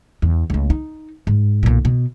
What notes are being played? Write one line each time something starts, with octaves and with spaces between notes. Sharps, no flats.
E2
C#2 A3
D#4
G#2
B1 A#2
B2